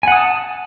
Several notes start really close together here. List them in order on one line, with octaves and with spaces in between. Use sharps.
G#5 F#5 D#6 A5